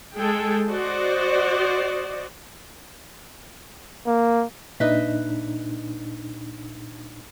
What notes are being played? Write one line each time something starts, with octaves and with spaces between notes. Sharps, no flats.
G#3 G#4 A4 G5
F#4 C5 D5 D#5
A#3
A#2 D4 D#4 B4 D#5 E5